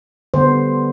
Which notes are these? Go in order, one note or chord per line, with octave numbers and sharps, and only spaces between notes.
D3 G3 B3 C5